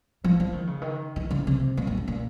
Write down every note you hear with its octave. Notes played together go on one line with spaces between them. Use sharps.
F3
F3
D#3
C#3
D#3
D#3
C#3
C3
A#2
F#2
F#2
A#2